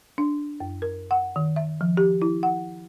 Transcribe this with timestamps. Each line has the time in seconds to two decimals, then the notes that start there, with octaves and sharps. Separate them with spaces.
0.18 D4
0.60 F#2
0.82 A#4
1.11 F#5
1.36 D#3
1.56 E5
1.81 F3
1.97 G4
2.22 E4
2.43 F#5